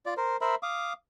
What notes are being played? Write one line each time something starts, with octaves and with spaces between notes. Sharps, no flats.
F4 D5
A#4 C5
A#4 C5 E5 B5
F5 D6 D#6